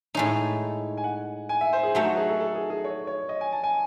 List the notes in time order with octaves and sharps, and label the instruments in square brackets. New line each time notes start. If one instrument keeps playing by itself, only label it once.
[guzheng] A2 G#3 D#4 [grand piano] C#5
[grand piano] G#5
F#5
G#5
E5
C5
G#4
[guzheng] F#3 A3 D#4 [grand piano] F#4
[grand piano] F#4
G#4
A4
A4
G#4
G#4
C#5
C#5
D#5
G#5
A5
G#5